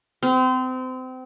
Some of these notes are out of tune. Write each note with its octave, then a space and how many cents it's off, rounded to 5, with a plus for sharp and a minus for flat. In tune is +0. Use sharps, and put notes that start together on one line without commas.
C4 -30